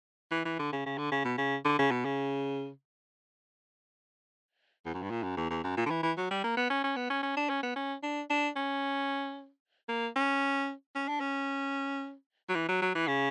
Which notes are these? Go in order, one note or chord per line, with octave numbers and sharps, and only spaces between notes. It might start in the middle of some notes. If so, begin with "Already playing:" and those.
E3
E3
D3
C#3
C#3
D3
C#3
B2
C#3
D3
C#3
B2
C#3
E2
F#2
G2
A#2
F#2
E2
E2
F#2
A#2
D3
E3
E3
F#3
G3
A#3
B3
C#4
C#4
B3
C#4
C#4
D4
C#4
B3
C#4
D4
D4
C#4
A#3
C#4
C#4
D4
C#4
F#3
E3
F#3
F#3
E3
C#3